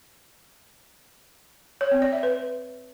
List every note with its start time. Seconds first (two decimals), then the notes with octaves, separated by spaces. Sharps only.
1.81 C#5
1.91 C4
2.02 D5
2.13 E5
2.23 B4